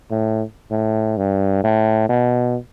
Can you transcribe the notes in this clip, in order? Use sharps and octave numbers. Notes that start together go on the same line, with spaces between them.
A2
A2
G2
A2
B2